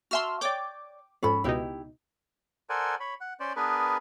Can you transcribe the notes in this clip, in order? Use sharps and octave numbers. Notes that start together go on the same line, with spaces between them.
F#4 E5 A5 C6 E6 F6
C#5 D5 G5 D6
F2 G#2 C#4 A4 B5
C#2 B2 D#4 E4 G4
A4 A#4 C5 D5 F#5 G#5
C#5 B5
F#5
C#4 C5 D5
B3 D4 G#4 A#4 B4